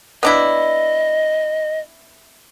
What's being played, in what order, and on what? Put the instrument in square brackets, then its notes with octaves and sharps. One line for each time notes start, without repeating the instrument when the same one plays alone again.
[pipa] B3 D4 E4 [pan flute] D#5